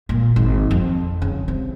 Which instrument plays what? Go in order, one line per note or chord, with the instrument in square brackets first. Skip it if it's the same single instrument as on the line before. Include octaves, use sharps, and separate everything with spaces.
[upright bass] A#2
G#1
F2
C#3
C3